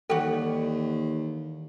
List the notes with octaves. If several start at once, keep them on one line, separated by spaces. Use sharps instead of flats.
D#2 D#3 E3 G3 F#4 G4 A4